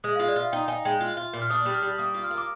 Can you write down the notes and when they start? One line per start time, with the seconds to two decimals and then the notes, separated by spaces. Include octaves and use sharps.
0.04 G#3 D#6
0.16 F5
0.20 F4
0.28 D5
0.36 F4 F5
0.52 D#4 G5
0.68 D#4 G#5
0.85 G#3 G5
1.00 F4
1.17 F4
1.33 A#2
1.42 F6
1.50 D4 D#6
1.66 G3
1.74 F6
1.82 G3
1.98 A#3 D#6
2.14 F4
2.24 F6
2.31 A#3
2.38 D6